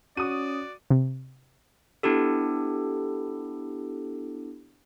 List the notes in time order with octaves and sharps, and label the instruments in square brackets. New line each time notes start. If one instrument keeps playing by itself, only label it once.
[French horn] C#4 [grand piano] F#4 [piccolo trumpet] D5 [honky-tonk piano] D#6 D#7
[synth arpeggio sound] C3
[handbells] B3 D4 E4 G4 A4